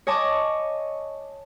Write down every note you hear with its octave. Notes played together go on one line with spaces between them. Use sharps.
C#5 D#5 G#5 A5 C#6 D6